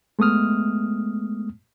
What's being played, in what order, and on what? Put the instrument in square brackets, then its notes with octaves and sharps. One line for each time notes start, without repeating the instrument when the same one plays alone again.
[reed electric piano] G#3 A3 B3 D#6 F6